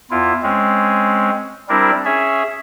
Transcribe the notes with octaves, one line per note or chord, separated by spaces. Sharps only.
E2 E4 F4
G#3 C4 C#4
G3 C4 D4 E4 A#4
C#4 G#4 E5